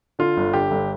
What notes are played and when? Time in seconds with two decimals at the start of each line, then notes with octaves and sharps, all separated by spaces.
0.19 D3 F4
0.37 G1
0.53 D3 G4
0.71 G1